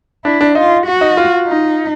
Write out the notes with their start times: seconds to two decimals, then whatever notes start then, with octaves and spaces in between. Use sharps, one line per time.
0.25 D4 E4
0.41 D4
0.55 D#4 F4
0.86 F#4
1.01 D#4
1.17 F4
1.47 D#4